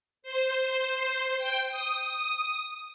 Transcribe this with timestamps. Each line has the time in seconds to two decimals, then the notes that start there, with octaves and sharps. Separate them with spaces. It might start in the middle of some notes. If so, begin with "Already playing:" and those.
0.22 C5
1.37 G5
1.69 D#6